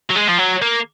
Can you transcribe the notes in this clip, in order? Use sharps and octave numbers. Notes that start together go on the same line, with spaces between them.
F#3
G#3
F3
F#3
A#3